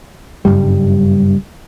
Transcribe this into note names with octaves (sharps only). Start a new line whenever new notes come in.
F#1 E2 G2 G3